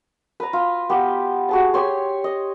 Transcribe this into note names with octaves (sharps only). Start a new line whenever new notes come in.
B4 A#5
F4
B3 G4
F#4 G#4 A5
G4 C#5 G#5 C6
D#5